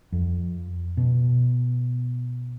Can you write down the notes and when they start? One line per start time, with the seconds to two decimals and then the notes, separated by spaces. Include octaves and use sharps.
0.12 F2
0.97 B2